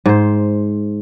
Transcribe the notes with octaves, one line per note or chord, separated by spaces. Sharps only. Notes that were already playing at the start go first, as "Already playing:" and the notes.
G#2 C5